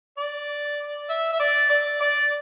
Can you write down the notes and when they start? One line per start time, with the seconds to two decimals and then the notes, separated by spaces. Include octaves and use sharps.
0.18 D5
1.09 E5
1.33 E5
1.40 D5
1.70 D5
2.01 D5